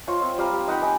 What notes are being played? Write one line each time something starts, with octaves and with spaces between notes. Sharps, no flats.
F4 C5 C#5 D#5
C4
G3 F5 A#5
G4
D#4 F#5 G5 B5
D#4 G#5 D6